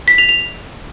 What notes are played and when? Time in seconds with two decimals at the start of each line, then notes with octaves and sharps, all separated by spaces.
0.08 B6
0.18 F7
0.29 F7